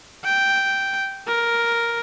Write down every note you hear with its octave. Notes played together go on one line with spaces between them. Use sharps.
G5
A#4